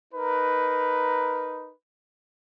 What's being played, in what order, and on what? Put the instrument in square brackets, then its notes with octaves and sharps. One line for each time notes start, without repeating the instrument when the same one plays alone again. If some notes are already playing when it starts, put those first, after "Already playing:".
[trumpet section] D#4 A#4 B4